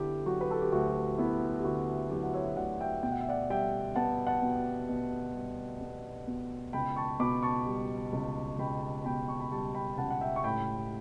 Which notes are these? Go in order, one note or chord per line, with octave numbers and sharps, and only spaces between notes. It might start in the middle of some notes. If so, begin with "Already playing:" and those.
Already playing: D3 B3 E4 G4 A4
F#3 F#4
B4
A4
G4
D2 F#4
B3 E4
G4
D3 F#4
F#3 E4 G4
F#5
C#5 E5
D2 D5 F#5
E5 G5
B2 G5
F#5
E5
D5 F#5
G3 E5 G5
B3 F#5 A5
F#5 A5
B2
B2
G3
B3
B2
C#2 G5 B5
A5 C#6
B2 B5 D6
A5 C#6
G3
C#2
C#2 G5 B5
B2 G5 B5
A5 C#6
B5
G3 A5 C#6
G5 B5
C#2 F#5 A5
F#5
E5 G5
C#6
A2 G5 B5